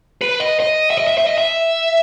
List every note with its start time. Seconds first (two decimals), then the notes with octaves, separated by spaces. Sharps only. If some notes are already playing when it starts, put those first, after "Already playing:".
0.21 B4
0.40 D#5
0.60 D#5
0.90 E5
0.98 D#5
1.08 E5
1.18 E5
1.27 D#5
1.38 E5